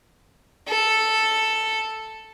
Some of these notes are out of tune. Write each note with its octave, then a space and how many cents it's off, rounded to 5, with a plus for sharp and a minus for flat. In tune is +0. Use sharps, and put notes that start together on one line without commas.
A4 +0